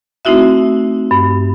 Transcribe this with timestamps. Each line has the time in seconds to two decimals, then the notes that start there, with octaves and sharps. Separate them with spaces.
0.25 A3 C4 D#4 E4 F#4 E5
1.11 G2